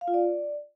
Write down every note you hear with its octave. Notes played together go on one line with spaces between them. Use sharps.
F5
F4
D5